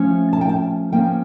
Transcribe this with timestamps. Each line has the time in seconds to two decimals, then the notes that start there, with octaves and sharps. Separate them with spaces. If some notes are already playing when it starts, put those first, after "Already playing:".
Already playing: F3 A3 C#4
0.33 A5
0.41 G5
0.49 A5
0.92 F3 A#3 C#4 G5